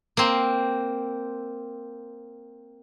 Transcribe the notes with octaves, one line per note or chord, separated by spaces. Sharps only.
A#3 C4